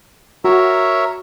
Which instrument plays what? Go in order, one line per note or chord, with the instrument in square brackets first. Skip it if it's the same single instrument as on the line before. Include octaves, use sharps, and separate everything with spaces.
[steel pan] F#4 [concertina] A#4 C#5 E5